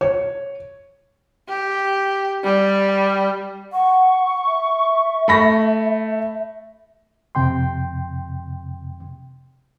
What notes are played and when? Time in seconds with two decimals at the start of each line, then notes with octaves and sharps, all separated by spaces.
0.01 C#5
1.49 G4
2.44 G3
3.73 F#5 C#6
4.46 E5
5.28 A3 B5 A#6
7.35 F2 C3 G5 C6